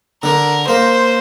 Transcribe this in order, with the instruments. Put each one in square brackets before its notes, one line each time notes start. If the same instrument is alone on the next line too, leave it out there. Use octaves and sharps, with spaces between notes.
[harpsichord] D3 [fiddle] A#4
[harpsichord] A#3 [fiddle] C5